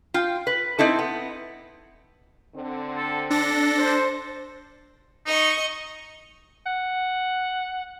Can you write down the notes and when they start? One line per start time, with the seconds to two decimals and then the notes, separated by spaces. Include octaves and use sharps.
0.14 F4 G5
0.47 B4
0.79 C4 D#4 E4 A4
0.99 B3
2.56 D3 C4
2.97 A4
3.30 D4 A4 A#6
3.78 C5
5.26 D#4 D#5 C#6
6.66 F#5